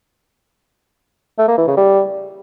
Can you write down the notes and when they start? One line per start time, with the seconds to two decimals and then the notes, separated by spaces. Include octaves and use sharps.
1.38 A3
1.48 A#3
1.58 E3
1.68 C#3
1.77 G3